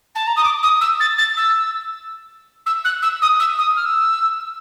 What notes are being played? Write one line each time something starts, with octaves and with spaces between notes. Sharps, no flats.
A5
A#5
D#6
D6
D#6
E6
A6
A6
E6
E6
F#6
E6
D#6
E6
D#6
F6
E6